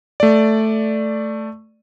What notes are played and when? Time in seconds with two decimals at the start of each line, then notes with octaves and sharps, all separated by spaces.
0.20 A3 D5